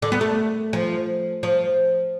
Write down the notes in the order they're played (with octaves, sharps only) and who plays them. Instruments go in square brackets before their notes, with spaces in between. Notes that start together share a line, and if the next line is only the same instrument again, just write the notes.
[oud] D3
B3
A3
F3
F3